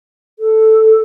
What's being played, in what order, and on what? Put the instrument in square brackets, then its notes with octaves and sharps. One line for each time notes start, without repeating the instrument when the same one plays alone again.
[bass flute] A4